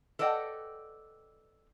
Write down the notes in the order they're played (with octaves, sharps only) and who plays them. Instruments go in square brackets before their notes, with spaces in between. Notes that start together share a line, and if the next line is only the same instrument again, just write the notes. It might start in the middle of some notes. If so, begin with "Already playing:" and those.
[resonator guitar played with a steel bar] A4 B4 D5 D#5 F#5 G5